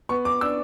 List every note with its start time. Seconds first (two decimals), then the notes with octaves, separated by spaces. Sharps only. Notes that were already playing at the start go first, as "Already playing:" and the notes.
0.09 B3 C#6
0.25 D6
0.41 D4 E6